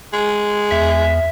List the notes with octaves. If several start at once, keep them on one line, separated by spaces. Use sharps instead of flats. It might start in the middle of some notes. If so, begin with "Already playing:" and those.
G#3
E2 E5